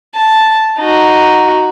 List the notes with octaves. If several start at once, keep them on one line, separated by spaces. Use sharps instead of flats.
A5
D#4 F#4